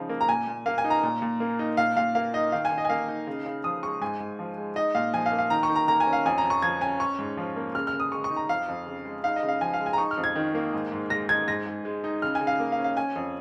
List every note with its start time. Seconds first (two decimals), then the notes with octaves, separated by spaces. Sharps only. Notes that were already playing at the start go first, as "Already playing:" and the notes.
Already playing: C#3 F3 G#3 D#4
0.09 A#3
0.21 A#5
0.29 A#2 G#5
0.47 A#2
0.66 A#3 F5
0.78 G#5
0.84 D#4
0.90 A#5
1.03 A#2
1.22 A#2
1.40 A#3
1.59 D#4
1.77 A#2 F5
1.96 A#2 F5
2.15 A#3 F5
2.34 D#4 D#5
2.52 D#3 F5
2.65 G#5
2.71 D#3
2.78 D#5
2.85 G#5
2.90 A#3 F5
3.08 D#4
3.27 C#3
3.46 C#3
3.64 F3 D#6
3.83 G#3 C#6
4.01 G#2 G#5
4.20 G#2
4.39 F3
4.58 G#3
4.76 D#4 D#5
4.95 A#2 F5
5.13 F3 G#5
5.26 F5
5.32 A#3
5.38 F5
5.50 D#3 A#5
5.63 C#6
5.69 D#3
5.76 A#5
5.88 A#3 A#5
6.00 G#5
6.07 C#4
6.13 F5
6.25 F2 G#5
6.38 A#5
6.44 F2
6.50 C#6
6.62 F3 G#6
6.81 C#4 G#5
7.00 C#4 C#6
7.19 G#2
7.37 F3
7.56 A#3
7.75 C#3 F6
7.87 F6
7.93 C#3
8.00 D#6
8.12 G#3 C#6
8.24 C#6
8.31 D#4
8.36 A#5
8.49 F2 F5
8.68 F2
8.87 C#3
9.05 G#3
9.24 D#4 F5
9.36 D#5
9.43 C#3
9.48 F5
9.61 F3 G#5
9.74 F5
9.80 G#3
9.86 G#5
9.93 A#5
9.98 D#4 C#6
10.11 F6
10.17 F2
10.24 G#6
10.35 D#3
10.55 A#3
10.73 G#2
10.92 G#2
11.10 G#3 A#6
11.29 D#4 G#6
11.48 G#2 A#6
11.67 G#2
11.85 G#3
12.04 D#4
12.22 C#3 F6
12.35 G#5
12.41 C#3
12.47 F5
12.60 A#3
12.72 F5
12.79 C#4
12.84 F5
12.97 C#4 G#5
13.16 F2